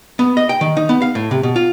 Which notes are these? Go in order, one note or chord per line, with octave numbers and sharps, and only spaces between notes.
B3
D#5
G5
D#3
D#4
B3
F5
A2
C3
B2
F4